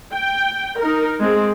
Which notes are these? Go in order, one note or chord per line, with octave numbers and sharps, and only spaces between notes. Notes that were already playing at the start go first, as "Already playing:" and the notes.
G5
D#4 A#4
G#3 C4